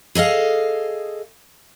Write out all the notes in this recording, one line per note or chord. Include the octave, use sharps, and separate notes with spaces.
G#4 A4 D#5 F5